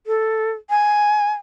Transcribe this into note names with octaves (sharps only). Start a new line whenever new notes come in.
A4
G#5